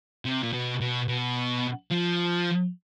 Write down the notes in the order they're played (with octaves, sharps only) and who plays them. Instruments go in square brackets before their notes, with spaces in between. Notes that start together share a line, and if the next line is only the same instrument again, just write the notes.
[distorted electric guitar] C3
A#2
B2
B2
B2
F3